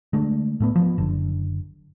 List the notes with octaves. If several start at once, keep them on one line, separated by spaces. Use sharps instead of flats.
D3 G#3 A3
A2 A3 B3
F3 B3
F#1 D3